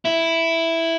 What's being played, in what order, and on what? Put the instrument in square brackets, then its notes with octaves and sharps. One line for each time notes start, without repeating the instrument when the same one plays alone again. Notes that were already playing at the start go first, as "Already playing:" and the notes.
[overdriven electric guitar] E4